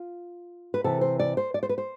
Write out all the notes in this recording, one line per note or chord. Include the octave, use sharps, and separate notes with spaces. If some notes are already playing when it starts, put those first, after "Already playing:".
Already playing: F4
B4
C3 E3 A4
C5
D5
C5
D5
C5
B4
C5